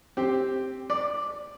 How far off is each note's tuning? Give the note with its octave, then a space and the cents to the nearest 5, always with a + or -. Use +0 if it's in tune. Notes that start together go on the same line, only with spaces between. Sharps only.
C4 +0 G4 +0 C5 +0
D5 +0 D6 +40